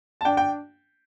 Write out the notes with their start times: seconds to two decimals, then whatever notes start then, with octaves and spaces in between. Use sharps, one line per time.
0.21 A5
0.25 D4 G5
0.37 G5